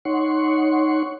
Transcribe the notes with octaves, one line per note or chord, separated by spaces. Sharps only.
D#4 C#5 F#5 C6 C#6